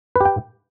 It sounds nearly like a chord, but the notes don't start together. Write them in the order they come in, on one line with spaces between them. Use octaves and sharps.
B4 G4 G5